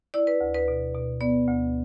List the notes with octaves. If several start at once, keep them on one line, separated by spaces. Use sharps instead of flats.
E4 D5
B4
D2
B4
B2
B2
B3 D5
D2